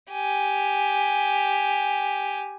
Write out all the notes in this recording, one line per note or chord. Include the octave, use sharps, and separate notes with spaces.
G4 G#5